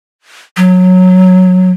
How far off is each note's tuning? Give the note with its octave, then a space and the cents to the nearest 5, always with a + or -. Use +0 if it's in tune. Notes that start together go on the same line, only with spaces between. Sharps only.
F#3 -10